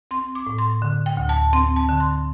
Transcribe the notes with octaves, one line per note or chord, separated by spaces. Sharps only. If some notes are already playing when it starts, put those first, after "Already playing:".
C4 C6
D6
A2
C6
D3
G5
D2
A5
C4 C6
A5
D3
C6